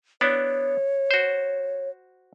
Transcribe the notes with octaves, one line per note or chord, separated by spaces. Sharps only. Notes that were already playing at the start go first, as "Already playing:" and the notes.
B3 D4 E4 C#5
F#4 C5